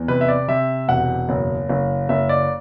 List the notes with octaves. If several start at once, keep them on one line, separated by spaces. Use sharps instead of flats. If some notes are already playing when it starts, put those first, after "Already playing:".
Already playing: E2
C3 B4
E5
D5
C3 E5
E1 F#5
F#1
F#1
F#1 E5
D5